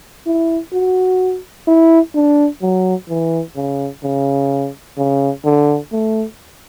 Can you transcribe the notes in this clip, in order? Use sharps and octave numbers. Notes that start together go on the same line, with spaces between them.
E4
F#4
E4
D4
F#3
E3
C#3
C#3
C#3
D3
A3